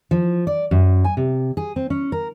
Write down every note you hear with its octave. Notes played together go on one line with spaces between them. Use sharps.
F3
D5
F#2
G#5
C3
G#4
C4
C#4
A#4